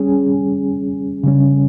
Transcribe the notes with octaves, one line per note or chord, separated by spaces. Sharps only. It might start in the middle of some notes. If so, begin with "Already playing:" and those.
Already playing: G3 C#4 G#4
C#3 G3 C#4